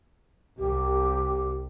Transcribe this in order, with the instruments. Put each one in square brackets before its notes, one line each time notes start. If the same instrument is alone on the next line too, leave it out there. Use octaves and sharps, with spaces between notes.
[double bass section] C2 [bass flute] G4